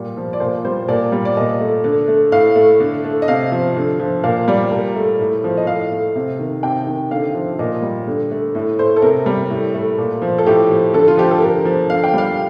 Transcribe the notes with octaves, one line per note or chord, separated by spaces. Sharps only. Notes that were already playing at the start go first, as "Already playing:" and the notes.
Already playing: A#2 G3
F3
D5
A#2 C5
G3 C5
A#2 D5
G3
D5
A#2 D#5
A3
D3
A3
A2 F5
A3
D3
A3
D#5
C3 F5
F3
D3
F3
A#2 F5
G3 D5
A#2 A#4
A3
A2
F3
D#5
A2 F5
A3
C3
D#3
C3 G5
D#3
D3 F5
F3
A#2 D#5
G3
D3
A3
A2
A3 C5
A4
C3 A#4
G3
A2
A3
A#2
F3
A4
A2 G4
F3
D3 A4
F4
F3 G4
A4
D3 A#4
F3
D3 F5
G5
G3 F5